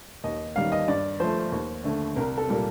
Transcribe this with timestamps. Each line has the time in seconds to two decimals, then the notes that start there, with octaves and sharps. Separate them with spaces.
0.24 D#2 D#5
0.56 D#3 G3 A#3 F5
0.72 D#5
0.88 G2 D5
1.20 F3 A3 C5
1.52 D#2
1.84 D3 A3
2.16 C2 A#4
2.38 A4
2.48 A#2 G3 A#3